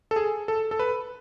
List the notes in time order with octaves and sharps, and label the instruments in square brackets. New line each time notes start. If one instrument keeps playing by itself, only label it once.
[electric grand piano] A4
G#4
A4
A4
B4